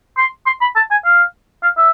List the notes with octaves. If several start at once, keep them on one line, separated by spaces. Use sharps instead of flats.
C6
C6
B5
A5
G#5
F5
F5
E5